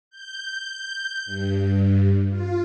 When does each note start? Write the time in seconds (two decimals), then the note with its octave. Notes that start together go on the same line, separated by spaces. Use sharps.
0.10 G6
1.26 G2
2.30 F4